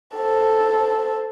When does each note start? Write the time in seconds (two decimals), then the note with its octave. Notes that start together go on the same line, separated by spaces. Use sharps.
0.15 A4 C5